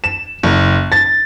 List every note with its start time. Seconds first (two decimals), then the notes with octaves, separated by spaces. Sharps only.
0.04 E7
0.43 F#1
0.92 A6